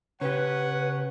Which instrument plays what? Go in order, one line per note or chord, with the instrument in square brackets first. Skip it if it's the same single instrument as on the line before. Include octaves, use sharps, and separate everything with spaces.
[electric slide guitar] C#3 G4 [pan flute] B4 [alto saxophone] C#5 [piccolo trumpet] F#5